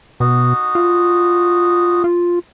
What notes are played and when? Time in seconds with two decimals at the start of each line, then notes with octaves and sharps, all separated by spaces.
0.20 B2 D#4 F#4
0.75 F4
2.04 F4